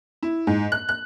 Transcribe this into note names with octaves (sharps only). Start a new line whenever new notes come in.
E4
G#2
F#6
F#6